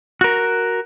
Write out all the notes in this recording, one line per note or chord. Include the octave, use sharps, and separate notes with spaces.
F#4 A#4